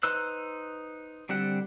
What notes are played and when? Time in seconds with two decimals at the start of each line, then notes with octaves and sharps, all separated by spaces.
0.03 D#4 B4 C5 E6 F#6
1.29 D3 G3 C4 F#5